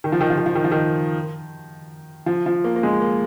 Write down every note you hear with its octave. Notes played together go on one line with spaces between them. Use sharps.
D#3
F3
D#3
F3
D#3
F3
D#3
F3
D#3
F3
F3
A#3
A#3
G#3
A#3